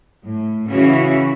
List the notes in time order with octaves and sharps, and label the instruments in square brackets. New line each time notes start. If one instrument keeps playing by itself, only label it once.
[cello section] A2
C#3 E3 C#4 E4 F#4